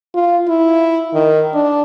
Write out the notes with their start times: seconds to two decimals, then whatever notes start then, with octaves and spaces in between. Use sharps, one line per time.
0.14 F4
0.48 E4
1.13 D#3
1.54 D4